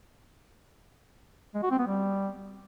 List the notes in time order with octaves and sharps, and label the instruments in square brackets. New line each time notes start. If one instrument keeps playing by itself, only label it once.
[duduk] G#3
F#4
C4
B3
G3